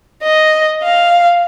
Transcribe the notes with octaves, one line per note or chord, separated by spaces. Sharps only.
D#5
F5